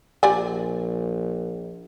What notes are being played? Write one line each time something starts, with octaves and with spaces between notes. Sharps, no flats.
A#1 G4 D5 G#5